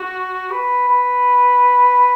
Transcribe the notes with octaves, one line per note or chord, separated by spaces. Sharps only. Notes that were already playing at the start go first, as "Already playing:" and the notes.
Already playing: F#4
B4
B4